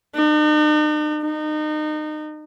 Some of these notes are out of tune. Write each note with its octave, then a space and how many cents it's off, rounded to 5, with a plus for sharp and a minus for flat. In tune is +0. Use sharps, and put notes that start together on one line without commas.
D#4 -45
D#4 -30